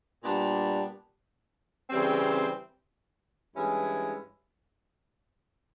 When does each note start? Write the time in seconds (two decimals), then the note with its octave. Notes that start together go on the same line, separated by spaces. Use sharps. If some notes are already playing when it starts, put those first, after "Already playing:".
0.24 A#2 G3 B3 D4
1.90 C#3 E3 G3 C4
3.55 G2 E3 G#3 C#4 E4